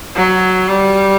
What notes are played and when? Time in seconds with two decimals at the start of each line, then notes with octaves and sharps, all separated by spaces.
0.15 F#3
0.68 G3